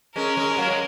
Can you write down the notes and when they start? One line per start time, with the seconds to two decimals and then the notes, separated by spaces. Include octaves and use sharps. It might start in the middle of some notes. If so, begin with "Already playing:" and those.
0.16 G#3 C#4 A#4
0.37 G#3 C#4
0.51 G#3
0.57 F#3 A#3
0.71 G#3